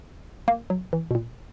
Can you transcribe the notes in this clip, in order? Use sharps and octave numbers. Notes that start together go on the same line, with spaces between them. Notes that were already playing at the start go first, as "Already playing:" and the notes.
A#3
F#3
E3
B2
A#2